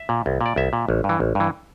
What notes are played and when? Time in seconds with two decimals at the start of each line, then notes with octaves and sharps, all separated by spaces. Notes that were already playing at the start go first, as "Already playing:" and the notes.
Already playing: E5
0.09 A#2
0.26 C2
0.41 A#2
0.46 D5
0.56 C2 E5
0.73 A#2
0.89 A1
1.04 G2
1.09 E3
1.20 A1
1.35 G2 E3